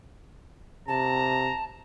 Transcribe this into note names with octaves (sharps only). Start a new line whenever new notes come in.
C3 A5 A#5